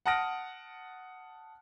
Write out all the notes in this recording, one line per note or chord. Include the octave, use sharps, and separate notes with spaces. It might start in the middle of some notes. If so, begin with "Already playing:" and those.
F#5 A5 D#6 F6 A#6 D7